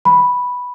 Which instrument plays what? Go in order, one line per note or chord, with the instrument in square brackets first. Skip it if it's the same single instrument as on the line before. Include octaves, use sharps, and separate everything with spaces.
[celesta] B5